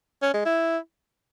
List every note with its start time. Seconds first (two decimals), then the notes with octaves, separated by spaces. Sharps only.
0.23 C#4
0.34 G#3
0.45 E4